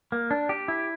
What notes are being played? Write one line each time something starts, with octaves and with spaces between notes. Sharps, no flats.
A#3
D4
G4
E4